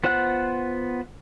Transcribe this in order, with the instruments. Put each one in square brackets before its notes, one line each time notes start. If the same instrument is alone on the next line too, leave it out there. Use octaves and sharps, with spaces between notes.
[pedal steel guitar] B3 F4 C5 F#5 F#6